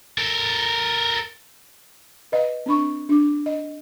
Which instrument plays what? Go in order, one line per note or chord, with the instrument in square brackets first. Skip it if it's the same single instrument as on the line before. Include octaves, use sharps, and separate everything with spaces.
[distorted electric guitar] A4 A#4
[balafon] B4 D#5 F5
C4 D4 B5 C#6
D4 D6
D#5